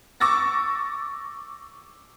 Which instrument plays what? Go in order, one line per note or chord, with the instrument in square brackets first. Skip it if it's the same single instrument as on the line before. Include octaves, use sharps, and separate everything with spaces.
[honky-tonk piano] C#6 D6 E6 A6 A#6